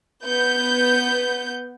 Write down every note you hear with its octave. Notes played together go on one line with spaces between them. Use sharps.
B3 G6